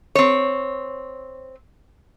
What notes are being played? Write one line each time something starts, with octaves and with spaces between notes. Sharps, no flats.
C4 C#5